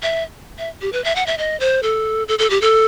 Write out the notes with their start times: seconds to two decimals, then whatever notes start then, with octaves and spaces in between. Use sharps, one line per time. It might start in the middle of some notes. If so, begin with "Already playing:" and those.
0.03 E5
0.59 E5
0.82 G4
0.93 B4
1.04 E5
1.16 F#5
1.27 E5
1.38 D#5
1.60 C5
1.83 A4
2.28 A4
2.39 A4
2.50 G4
2.61 A4